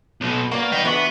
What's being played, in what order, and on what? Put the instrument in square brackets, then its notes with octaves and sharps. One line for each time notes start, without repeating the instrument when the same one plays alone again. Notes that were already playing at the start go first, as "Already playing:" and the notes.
[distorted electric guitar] B1 B2
[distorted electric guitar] A#3 [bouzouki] F#4 B4 D5
[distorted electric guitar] D#5 G5
[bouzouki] E3 D4 F#4 [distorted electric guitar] B3